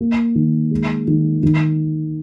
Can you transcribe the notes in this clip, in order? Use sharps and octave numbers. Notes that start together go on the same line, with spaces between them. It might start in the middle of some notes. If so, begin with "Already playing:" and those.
A#3
D#3
G#3
D#3
D#3